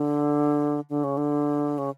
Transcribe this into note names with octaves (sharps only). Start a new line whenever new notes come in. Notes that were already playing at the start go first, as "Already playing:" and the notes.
Already playing: D3
D3
C#3
D3
C#3